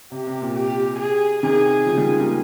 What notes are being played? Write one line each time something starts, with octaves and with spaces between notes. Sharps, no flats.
C3 G4
C3
A#2
G4
G#4
C3 D#3 G#4
C#3 F3
D#3 G3
F3 G#3
G3 A#3